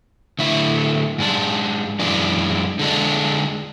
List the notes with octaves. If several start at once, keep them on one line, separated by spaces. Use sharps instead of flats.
D3 A3 E4
G#2 G#3 D4
F#2 E3 G#3 D4
D3 G#3 D4